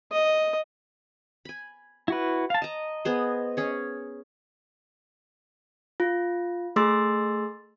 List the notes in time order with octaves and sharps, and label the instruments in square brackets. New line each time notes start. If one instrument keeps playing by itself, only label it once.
[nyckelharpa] D#5
[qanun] G#5 B5
[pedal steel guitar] E4 F#4 B4
F5 A5
[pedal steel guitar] D#5 [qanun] A5 A#5
[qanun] B3 G#4 C5
C#4 G#4 C#5
[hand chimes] F4
A3 G#4 C6 E6 A6